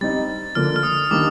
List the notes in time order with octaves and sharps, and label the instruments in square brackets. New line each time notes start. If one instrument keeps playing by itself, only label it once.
[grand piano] G3 C4 D#4 [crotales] A6
[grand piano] D3 F3 A#3 D4 [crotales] F6
[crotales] F6
D#6
[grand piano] D#3 G3 A#3 D4 [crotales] D6